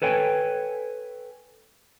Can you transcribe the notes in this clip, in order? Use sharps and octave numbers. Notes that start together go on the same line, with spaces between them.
A4 B4 C#5 G5 G#5